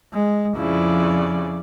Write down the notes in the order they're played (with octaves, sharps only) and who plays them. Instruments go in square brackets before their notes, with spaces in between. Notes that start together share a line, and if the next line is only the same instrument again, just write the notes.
[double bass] G#3
[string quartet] F2 C#3 D5 [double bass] F3 E4